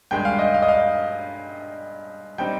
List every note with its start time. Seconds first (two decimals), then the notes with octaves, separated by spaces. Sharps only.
0.11 G2 D#3 G#3 G5
0.25 F5
0.39 D#5
0.54 F5
0.62 D#5
0.68 F5
2.38 G3 C4 D#4 G5